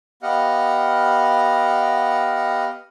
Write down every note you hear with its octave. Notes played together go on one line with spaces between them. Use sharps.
B3 G4 D#5 F5 F#5